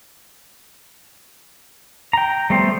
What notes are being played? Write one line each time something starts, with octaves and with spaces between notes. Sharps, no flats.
G5 A#5
G3 A3 B3 C5